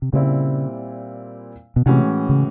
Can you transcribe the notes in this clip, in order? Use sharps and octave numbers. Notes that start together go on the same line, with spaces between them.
C3
A#2 C#3 G3 C4 E4
B2
A2 C3 E3 G#3 C#4 F#4
C#3